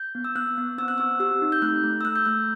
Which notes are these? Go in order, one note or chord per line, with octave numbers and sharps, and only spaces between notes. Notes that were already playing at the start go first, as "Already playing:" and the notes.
Already playing: G6
B3
E6
B3 F#6
B3
C4 E6
F#6
C4 E6
G4 E6
D#4
G6
A3 F#6
A3
E6
A3 F#6
G6
A3 F#6